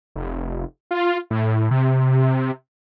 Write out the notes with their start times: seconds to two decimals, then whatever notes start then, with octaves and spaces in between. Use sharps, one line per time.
0.16 F1
0.91 F4
1.31 A2
1.71 C3